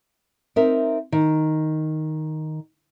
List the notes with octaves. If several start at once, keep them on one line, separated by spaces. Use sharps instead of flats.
C4 D#4 A#4 E5
D#3